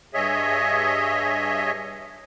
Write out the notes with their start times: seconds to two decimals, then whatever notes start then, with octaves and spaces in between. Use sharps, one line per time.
0.14 G2 G#4 C#5 D#5 E5